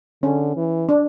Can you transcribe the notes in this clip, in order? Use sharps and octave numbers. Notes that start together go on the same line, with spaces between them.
D3 C#4
E3
D4